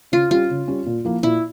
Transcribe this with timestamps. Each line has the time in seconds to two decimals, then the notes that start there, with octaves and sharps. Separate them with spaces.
0.12 C#3 F4
0.31 G3 C#4 F4
0.50 C#3
0.68 G3 C#4
0.86 A#2
1.05 F3 A#3 E4
1.23 A#2 E4